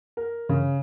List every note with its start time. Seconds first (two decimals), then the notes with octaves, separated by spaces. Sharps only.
0.17 A#4
0.49 C#3